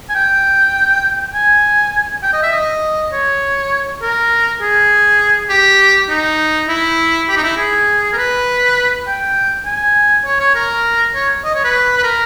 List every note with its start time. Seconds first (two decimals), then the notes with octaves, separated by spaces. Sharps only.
0.09 G#5
0.15 G5
1.34 G#5
2.23 G5
2.33 D#5
2.43 E5
2.53 D#5
3.13 C#5
4.02 A#4
4.61 G#4
5.49 G4
6.09 D#4
6.68 E4
7.29 G4
7.37 D#4
7.43 E4
7.57 G#4
8.13 A#4
8.17 B4
9.07 G5
9.66 G#5
10.25 C#5
10.40 C#5
10.55 A#4
11.15 C#5
11.44 D#5
11.55 C#5
11.65 B4
11.97 B4
12.04 A#4